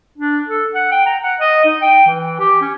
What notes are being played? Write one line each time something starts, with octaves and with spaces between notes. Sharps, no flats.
D4
A4
F#5
G5
A#5
F#5
D#5
D#4
G5
E3
G4
C#4